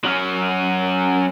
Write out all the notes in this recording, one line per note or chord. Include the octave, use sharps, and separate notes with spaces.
F#3 C#4